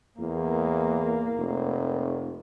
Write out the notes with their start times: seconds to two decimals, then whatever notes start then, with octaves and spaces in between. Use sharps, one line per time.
0.19 E2 A#3
1.38 F1